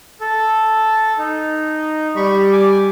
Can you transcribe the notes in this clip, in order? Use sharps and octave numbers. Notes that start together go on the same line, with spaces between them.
A4
D#4
G3 B5 C#6
G#5 D6